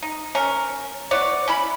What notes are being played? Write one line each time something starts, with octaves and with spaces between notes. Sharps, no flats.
D#4
C#4 A#4
B3 E4 C#5 D5
C#4 E4 B5